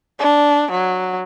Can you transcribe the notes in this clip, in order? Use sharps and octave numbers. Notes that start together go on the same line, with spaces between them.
D4
F#3